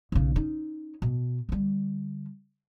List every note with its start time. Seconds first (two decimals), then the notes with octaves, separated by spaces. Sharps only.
0.12 B1 C#3
0.36 C#4 D#4
1.02 B2
1.49 D3 G3